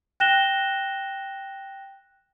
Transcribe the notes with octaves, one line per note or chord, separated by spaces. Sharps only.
G5 F#6 A#6 E7 G7